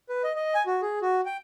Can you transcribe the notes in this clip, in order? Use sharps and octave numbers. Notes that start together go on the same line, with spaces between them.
B4
D#5
D#5
G#5
F#4
G#4
F#4
G5